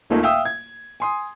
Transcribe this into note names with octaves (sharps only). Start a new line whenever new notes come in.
D#1 A#2 A3 A#3 D#4
E5 F5 G5 D#6 E6
G#6
G#5 C6 D#6